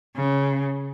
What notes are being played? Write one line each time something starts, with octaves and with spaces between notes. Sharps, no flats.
C#3